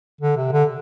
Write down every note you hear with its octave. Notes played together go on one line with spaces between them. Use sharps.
D3
C3
D3